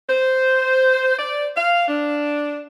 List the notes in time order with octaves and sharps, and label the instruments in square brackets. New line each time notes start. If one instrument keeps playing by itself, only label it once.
[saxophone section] C5
D5
F5
D4